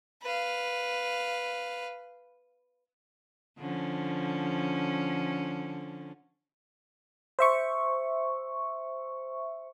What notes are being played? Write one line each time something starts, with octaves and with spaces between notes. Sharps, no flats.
B4 F5
D3 F3 C#4
C5 E5 C#6